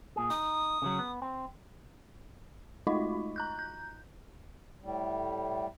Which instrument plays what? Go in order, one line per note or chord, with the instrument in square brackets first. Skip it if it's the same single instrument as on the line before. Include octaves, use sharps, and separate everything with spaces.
[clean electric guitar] A#2 G#4
[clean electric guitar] D#4 [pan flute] D#6
[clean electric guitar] C#3 E3 F#3
B3
C4
[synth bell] G#3 A3 D#4 F4 F#4 D#5
A#5 F#6 G6
G6
[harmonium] A2 G3